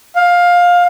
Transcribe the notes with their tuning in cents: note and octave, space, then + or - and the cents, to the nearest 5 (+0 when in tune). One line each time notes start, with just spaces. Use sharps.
F5 +15